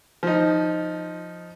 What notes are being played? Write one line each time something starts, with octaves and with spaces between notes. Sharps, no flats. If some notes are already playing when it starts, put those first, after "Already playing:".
F3 D#4